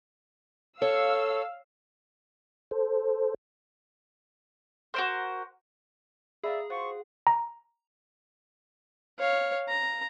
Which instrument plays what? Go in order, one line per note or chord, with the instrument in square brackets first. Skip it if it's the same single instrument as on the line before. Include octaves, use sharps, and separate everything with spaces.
[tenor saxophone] A4 [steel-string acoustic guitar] C#5 [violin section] F5 E6
[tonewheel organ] A4 C5
[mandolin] F#4 A#4 C5
[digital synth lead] G#4 [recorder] D5 [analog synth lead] E5 [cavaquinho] F5 A#5 B5
[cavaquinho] F4 F#4 F#5 [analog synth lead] C5 [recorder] C#6
[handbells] A#5
[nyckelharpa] C#5 F5
A#5